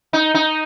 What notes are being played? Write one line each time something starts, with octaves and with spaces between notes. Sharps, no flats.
D#4
D#4